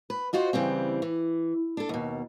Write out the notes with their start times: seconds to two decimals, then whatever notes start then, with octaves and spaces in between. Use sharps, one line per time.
0.10 B4
0.33 D#4 F4 F#4 C5
0.53 C#3 E3 G3 C4
1.02 E3
1.77 D4 A4
1.89 D#2 B2